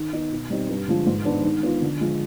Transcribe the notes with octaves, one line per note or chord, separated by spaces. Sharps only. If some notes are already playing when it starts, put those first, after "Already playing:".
Already playing: D#3
B3 D#4
B2
G3 C4 D#4
G2
D3 F3 G#3
G#2
D#3 B3 D4
D#3
B3 F4
D3
F3 G#3